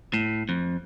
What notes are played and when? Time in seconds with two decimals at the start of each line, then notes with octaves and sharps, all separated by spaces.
0.14 A2
0.49 F2